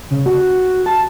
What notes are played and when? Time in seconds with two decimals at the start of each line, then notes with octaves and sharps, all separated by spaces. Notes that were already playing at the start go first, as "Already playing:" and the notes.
0.11 C#3
0.26 F#4
0.86 A5